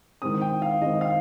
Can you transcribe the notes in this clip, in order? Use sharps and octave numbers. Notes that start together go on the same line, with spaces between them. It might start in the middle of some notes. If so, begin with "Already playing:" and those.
D#3 G#3 C4 D#6
G5
F5
D#3 G#3 C4 D#5
F5